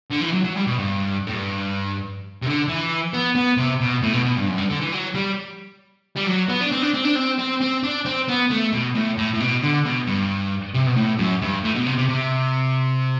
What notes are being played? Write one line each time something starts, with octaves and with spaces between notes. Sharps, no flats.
D3
E3
F#3
F#3
G3
B2
G2
A2
G2
C3
D3
E3
B3
B3
C3
B2
A2
B2
B2
G2
F#2
G2
D3
E3
F#3
G3
G3
F#3
B3
D4
C4
D4
C4
D4
C4
C4
C4
D4
C4
B3
A3
B2
A2
A2
A2
B2
D3
B2
G2
C3
B2
A2
F#2
G2
A2
B2
C3
C3
C3